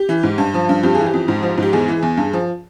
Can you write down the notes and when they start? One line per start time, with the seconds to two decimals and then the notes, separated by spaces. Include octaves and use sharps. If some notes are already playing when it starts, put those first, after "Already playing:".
Already playing: G4
0.09 E3
0.23 G#2
0.38 G2
0.54 F3
0.69 G2
0.83 F2 G4
0.95 E3 G#4
1.06 G4
1.14 F2
1.28 G#2
1.43 F3
1.58 G#2 G4
1.73 E2 G#4
1.88 E3
2.03 E2
2.17 G2
2.33 F3